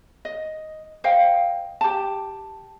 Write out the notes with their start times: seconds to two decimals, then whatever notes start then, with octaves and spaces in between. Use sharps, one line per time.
0.25 D#5
1.04 C5 D#5 F5 G5
1.81 G4 A5